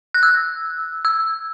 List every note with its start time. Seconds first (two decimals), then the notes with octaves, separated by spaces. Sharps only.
0.14 F#6
0.23 E6
1.05 E6